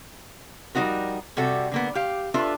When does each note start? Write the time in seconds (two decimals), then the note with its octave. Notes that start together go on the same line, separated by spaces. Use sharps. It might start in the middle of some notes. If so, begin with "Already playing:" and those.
0.75 F3 G3 C4 D#4 F#4 A#4
1.37 C3 G3 F#4 A4
1.72 D3 A#3 B3
1.95 G4 F5
2.34 D4 F4 A4 B4 E5